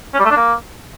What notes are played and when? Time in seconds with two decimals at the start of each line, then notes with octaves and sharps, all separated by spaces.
0.14 C#4
0.19 G3
0.25 A3
0.31 D4
0.36 A#3